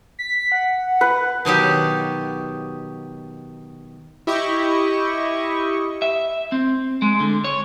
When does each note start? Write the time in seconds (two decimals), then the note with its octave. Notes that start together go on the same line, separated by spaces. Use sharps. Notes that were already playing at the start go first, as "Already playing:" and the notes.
0.19 B6
0.52 F#5
1.01 B4
1.45 B2 D#3 F#3 G4
4.27 E4 G4 D#5 C#6
6.02 E5
6.52 C4
7.02 G#3
7.20 D3
7.44 C#5